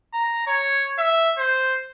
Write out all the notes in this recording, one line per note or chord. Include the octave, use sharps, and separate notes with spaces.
A#5
C#5
E5
C5